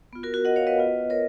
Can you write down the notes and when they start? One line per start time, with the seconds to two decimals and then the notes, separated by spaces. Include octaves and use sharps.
0.13 B3 F4
0.23 F#4 A#4
0.34 F#4 A#4
0.45 D#5 F#5
0.56 C#5 F5
0.67 B4 D#5
0.78 B3 F4
1.10 A#4 C#5